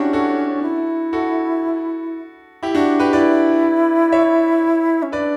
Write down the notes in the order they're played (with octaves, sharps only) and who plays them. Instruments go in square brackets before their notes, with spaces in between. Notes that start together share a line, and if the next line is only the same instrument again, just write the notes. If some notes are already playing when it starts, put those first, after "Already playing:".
Already playing: [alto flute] C#4 [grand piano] D4 E4 F#4 G4
[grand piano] F#4 A4
[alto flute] E4
[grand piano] F#4 A4
E4 G4
D4 F#4
G4 B4
[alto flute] E4 [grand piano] B4 D5
[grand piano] C#5 E5
[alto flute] C#4
[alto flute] D4 [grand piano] B4 D5